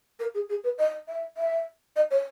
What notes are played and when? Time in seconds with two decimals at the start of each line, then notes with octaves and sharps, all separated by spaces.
0.19 A#4
0.34 G#4
0.49 G#4
0.64 B4
0.78 D#5
1.07 E5
1.37 E5
1.96 D#5
2.10 C#5